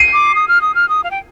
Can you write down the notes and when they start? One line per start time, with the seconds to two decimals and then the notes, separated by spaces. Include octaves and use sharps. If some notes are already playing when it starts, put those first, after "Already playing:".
Already playing: C7 D#7
0.13 D6
0.35 D#6
0.48 F6
0.62 D#6
0.75 F6
0.89 D#6
1.04 F5
1.11 G5